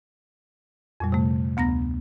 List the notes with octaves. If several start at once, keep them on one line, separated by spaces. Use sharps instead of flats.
F2 A#2 G3
C3 A3
D2 B3 A#5 A#6